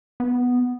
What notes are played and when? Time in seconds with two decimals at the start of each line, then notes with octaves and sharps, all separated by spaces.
0.20 B3